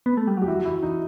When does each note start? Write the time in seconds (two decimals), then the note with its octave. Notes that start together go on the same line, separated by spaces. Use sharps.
0.06 B3
0.17 A3
0.27 G3
0.37 F#3 G4
0.48 E3 F#4
0.65 E3 E4
0.82 D#4